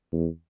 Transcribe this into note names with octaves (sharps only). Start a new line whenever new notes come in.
E2